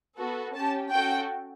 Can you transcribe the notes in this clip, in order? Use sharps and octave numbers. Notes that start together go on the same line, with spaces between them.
B3 F#4 A4
C#4 G4 A5
C#4 F#4 A4 G5